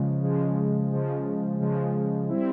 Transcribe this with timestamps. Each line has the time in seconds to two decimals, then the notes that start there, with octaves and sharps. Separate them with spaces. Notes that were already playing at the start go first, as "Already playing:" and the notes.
Already playing: C#3 F3 G#3
0.24 C#3 F3 G#3
0.92 C#3 F3 G#3
1.60 C#3 F3 G#3
2.29 G3 C4 E4